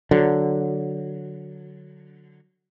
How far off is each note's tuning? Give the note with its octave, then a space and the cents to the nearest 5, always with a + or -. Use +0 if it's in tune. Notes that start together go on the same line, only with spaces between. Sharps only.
D3 +0 F#3 +0